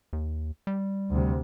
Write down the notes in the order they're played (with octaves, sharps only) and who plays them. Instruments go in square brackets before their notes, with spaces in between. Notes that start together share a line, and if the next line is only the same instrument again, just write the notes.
[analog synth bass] D#2
G3
[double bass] D2 C3